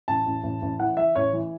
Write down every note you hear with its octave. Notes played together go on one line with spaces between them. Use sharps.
A1 A5
A1
A1
A1
E3 F#5
E3 E5
A1 C#5
E3